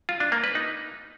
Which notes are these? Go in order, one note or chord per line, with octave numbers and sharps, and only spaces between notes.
F4
D4
A#3
B4
D#4